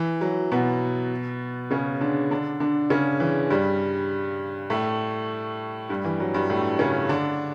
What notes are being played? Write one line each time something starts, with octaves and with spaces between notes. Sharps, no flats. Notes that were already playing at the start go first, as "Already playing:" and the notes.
Already playing: E3
F#3
B2 B3
C#3 C#4
D3 D4
D3 D4
D3 D4
C#3 C#4
E3
G2 G3
A2 A3
G2 G3
E3
F#3
G2 G3
A2 A3
C#3 C#4
D3 D4